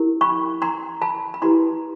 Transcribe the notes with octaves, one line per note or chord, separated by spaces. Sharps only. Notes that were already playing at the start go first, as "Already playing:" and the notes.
Already playing: E4 G4 A#4
B5 C#6
A#5 C6
A5 B5
B5
E4 G4 B4 A#5 C6